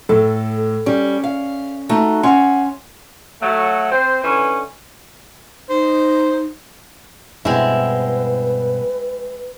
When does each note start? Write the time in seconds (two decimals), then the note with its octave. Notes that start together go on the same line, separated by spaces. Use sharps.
0.09 A2 A4
0.86 G3 C#4
1.24 F5
1.89 A3 D#4 F#4
2.23 C#4 F#5 G#5 C6
3.41 F#3 A3
3.91 C4 C5
4.24 D3 E3 C#4
5.69 D#4 C5
7.45 G2 B2 G#3 C4 E4 B4